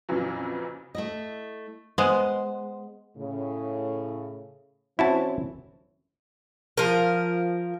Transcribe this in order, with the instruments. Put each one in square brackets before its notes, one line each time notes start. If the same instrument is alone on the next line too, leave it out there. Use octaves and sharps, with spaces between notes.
[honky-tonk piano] F2 A#2 C#3 E3 F#3
[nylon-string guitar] A3 E4 D#5
[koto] G#3 B3 [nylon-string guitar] C5
[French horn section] A2 C#3
[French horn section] E3 C4 C#4 [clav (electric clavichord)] E4 F#4 A5
[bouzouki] F3 A#4